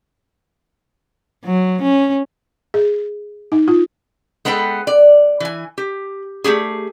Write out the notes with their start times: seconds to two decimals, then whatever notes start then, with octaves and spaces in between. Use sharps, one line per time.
1.45 F#3
1.82 C#4
2.74 G#4
3.52 D#4
3.68 F4
4.45 G#3 B3 A4 B4 G5
4.87 D5
5.40 E3 G#5
5.78 G4
6.44 A3 C4 G4 G#4